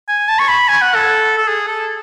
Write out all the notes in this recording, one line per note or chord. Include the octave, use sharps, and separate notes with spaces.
G#5
A5
C#6
B5
G#5
F#5
A4
A4
G#4
A4